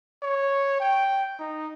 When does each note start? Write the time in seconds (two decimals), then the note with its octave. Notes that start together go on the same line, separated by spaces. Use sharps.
0.23 C#5
0.80 G5
1.39 D#4